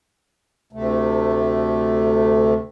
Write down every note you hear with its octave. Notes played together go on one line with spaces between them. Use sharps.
D2 C3 A3